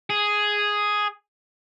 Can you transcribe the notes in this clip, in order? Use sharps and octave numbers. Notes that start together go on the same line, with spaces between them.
G#4